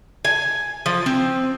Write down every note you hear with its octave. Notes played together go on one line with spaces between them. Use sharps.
G#5
F3
C4